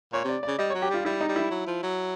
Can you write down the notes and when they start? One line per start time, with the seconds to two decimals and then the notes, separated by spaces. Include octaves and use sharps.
0.13 A#2 C#5
0.24 C3 D5
0.43 C#3 D5
0.59 G3 D#5
0.70 C#5
0.75 F#3
0.82 G4
0.90 G3 F4
1.05 G3 E4
1.20 D#4
1.28 G3
1.36 E4
1.51 F#3
1.67 F3
1.83 F#3